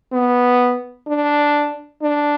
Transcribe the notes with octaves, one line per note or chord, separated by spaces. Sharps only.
B3
D4
D4